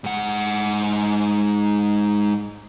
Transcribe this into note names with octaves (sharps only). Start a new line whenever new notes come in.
G#2 F#5